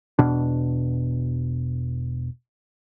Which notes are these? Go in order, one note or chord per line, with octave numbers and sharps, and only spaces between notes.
E1 B2 D4